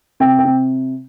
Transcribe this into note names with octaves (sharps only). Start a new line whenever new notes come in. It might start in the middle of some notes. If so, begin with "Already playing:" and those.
C3 G5
G5
C3